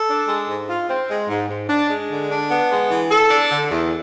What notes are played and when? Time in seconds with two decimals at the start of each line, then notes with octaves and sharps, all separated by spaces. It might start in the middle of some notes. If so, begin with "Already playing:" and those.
Already playing: A4
0.09 D4
0.28 G#3
0.49 G#2
0.69 F4
0.89 C4
1.09 G#3
1.29 G#2
1.49 G#2
1.69 D4
1.90 G#3
2.09 D3
2.30 D4
2.51 B3
2.70 G#3
2.90 E3
3.11 A4
3.31 D4
3.50 D3
3.71 E2